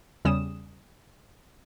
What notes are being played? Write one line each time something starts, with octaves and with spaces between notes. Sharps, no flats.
E2 C#3 G3 C#4 D#6 E7